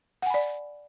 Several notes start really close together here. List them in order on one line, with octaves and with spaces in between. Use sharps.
F#5 G#5 B5 D5